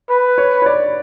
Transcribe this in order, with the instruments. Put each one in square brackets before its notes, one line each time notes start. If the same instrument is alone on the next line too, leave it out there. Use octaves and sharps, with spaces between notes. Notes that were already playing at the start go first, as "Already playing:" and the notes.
[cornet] B4
[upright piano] C#5
C#5
D5